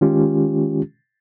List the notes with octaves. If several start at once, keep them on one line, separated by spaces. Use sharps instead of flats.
D#3 G#3 C#4 F4 G4